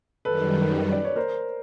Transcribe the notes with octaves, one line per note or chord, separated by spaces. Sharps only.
F#2 D#3 G3 A4 B4
D5
C#5
A#4 C5